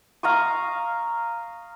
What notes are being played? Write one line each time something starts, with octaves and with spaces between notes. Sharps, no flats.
F5 A#5 C#6 D#6